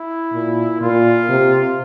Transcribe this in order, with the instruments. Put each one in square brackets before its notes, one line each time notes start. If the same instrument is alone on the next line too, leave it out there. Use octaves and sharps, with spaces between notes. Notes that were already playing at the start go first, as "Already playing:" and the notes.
Already playing: [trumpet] E4
[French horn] A#2
[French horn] A#2 [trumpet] F4
[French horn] C3